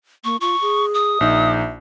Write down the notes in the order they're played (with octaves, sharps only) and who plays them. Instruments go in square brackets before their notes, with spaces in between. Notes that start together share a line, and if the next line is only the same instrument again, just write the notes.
[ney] A#3 [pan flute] C#6
[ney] F4 [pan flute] C#6
[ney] G#4
[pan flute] D#6
[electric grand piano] A#1 D#4 [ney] E5